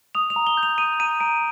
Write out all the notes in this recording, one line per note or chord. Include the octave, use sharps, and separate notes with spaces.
D#6 F7
F7
A#5
G7
G6
F7
D#6 D#7
A#5 D#7
A#5 D7